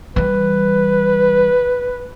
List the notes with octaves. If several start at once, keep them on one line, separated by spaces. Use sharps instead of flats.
E3 G3 B4